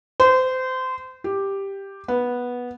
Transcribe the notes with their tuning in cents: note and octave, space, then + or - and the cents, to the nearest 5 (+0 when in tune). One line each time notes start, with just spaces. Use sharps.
C5 -25
G4 +5
B3 -10